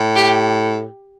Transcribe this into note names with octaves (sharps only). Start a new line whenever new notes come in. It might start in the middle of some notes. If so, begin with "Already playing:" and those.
Already playing: A2
G4